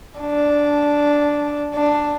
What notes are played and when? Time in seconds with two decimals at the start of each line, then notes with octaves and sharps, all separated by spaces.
0.19 D4
1.75 D4